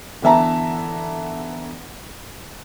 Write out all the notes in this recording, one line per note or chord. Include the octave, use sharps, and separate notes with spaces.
D3 E3 B3 E5 A5 A#5